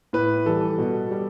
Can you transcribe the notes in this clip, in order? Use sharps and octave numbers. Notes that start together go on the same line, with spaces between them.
A2 B4
E3 G3 A4
B2
G3